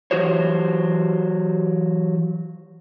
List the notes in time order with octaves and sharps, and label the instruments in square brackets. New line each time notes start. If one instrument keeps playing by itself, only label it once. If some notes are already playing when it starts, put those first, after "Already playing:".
[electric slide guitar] E3 F#3 F#4 G4 C5 C#5